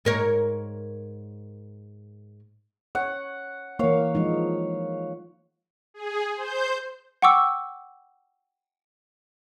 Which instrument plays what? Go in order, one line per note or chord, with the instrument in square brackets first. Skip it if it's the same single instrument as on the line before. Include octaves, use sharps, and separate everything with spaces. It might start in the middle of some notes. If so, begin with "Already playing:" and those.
[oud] G#2 A#4 C#5
[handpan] C#5 [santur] F#5
[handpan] E3 A#3 [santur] C#5 F5
[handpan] F3 G#3 D#4
[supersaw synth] G#4
C5 G6
[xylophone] F#5 G5 C#6 D6 E6